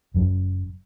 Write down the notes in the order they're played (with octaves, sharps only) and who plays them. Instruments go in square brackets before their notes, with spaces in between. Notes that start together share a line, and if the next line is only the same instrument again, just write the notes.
[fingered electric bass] F#1 F#2 F#3